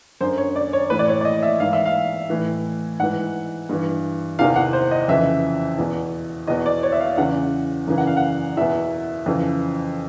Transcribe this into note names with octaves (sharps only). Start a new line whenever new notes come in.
F#2 D3 C5
C#5
D5
C#5
A2 E3 B4
D5
C#5
D5
D#5
E5
G#2 E3 F5
E5
F5
A2 E3
G#2 E3 F#5
G2 E3
E2 C3 D#3 F5
F#5
C5
D#5
F2 C#3 E3 E5
E2 B2
E2 B2 D#5
D5
C#5
E5
F5
E2 C#3 E3 F#5
F#2 C#3 E3
F#5
F5
F#5
E2 B2 E5
F2 C#3 E3